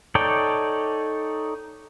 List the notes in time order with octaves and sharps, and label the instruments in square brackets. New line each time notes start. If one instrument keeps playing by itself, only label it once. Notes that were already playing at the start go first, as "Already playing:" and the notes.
[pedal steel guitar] D#4 A4 C#5 D5 G5